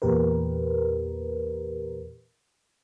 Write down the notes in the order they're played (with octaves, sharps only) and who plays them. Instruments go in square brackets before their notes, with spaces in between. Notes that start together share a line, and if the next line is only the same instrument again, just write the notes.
[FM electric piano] E2 A#2 G4 A#4 B4